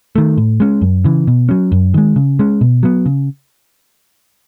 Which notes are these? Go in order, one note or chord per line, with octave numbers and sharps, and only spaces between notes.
D#3 A3
A2
G#3 C#4
F#2
C#3 E3
B2
F#3 C#4
F#2
D#3 G#3
C#3
G#3 C#4
B2
F#3 B3
C#3